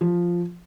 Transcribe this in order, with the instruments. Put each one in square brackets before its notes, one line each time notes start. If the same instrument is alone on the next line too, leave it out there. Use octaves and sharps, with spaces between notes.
[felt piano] F3